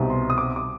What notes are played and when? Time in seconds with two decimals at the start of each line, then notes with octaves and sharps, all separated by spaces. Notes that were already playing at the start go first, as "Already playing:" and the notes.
Already playing: C2 B2 G3 C4 D#4
0.10 C6
0.30 D#6
0.38 D6
0.56 D6